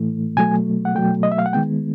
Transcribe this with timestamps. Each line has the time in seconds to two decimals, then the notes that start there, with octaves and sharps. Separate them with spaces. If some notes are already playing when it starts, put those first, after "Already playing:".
Already playing: A2 E3 A3
0.37 B2 F#3 A3 G#5
0.85 F#5
0.95 B2 F#3 A3 G5
1.23 D#5
1.32 E5
1.38 F5
1.46 F#5
1.53 D#3 G#3 B3 G5